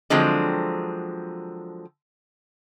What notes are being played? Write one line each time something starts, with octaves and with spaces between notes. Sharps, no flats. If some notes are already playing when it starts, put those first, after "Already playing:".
D3 F3 F#3 G#3 C4